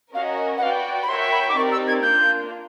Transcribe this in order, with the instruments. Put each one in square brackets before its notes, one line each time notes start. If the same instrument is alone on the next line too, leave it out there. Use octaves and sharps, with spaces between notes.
[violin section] C#4 F#4 A#4 D#5 [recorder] F5
[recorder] F#5
[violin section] F#4 B4 D5 G5 [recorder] F5
[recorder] B5
[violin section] F#4 A#4 C#5 E5 G5 [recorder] C6
[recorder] B5
D6
[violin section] C4 D#4 G4 A#4 D5 [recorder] C#6
[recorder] E6
G#6
[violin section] A#3 D4 F4 [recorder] G6